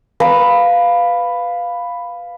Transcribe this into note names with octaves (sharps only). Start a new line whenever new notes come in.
B4 F5 A#5